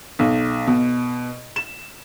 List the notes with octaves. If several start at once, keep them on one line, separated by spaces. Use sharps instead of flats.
B1
B2
E7